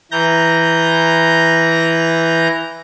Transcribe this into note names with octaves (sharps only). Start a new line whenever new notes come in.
E3 A#5 G6 A#6